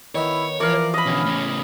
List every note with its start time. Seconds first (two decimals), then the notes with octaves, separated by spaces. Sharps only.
0.15 D#3 B3 E4 C#5
0.60 E3 F3 A#4 D5 F5
0.94 D#5 B5
1.06 B2 D3 C#4
1.25 A2 C#3